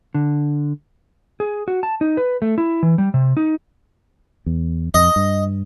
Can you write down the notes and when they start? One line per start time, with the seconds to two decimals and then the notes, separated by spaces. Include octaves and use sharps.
0.15 D3
1.40 G#4
1.68 F#4
1.83 A5
2.01 D#4
2.17 B4
2.42 A3
2.58 E4
2.83 E3
2.98 G3
3.14 C3
3.37 D#4
4.46 E2
4.94 F2 D#5
5.16 G2